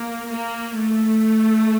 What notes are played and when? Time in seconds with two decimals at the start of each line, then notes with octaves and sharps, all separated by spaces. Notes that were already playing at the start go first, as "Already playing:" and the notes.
Already playing: A#3
0.32 A#3
0.80 A3